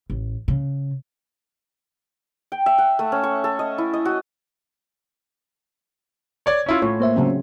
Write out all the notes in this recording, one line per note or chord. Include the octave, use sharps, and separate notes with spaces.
A1
C#3
G5
E5
F#5
A3
C#4
C#6
A4
D#5
E4
D#5
F#4
C#5 D5 G#6
C#4 E4 F4
A2 F4 C#5
A#3 C5 E5
C#3 F#3 C4